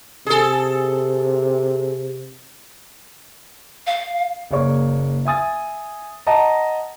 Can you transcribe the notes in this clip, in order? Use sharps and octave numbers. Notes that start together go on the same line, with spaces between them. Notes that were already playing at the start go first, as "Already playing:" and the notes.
C3 G#4 A4
F5
F#1 A#3 G#4 C#5 D5 C#6
E5 G#5 D#6 A6
D#5 F#5 A5 A#5